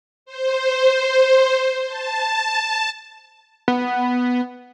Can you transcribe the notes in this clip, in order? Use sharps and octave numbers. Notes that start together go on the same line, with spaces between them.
C5
A5
B3